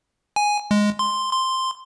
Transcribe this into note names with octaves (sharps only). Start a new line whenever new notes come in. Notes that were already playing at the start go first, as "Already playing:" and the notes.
G#5
G#3
C6
C6